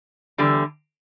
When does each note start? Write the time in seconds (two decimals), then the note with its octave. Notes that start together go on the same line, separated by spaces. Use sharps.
0.38 E2 D3 G3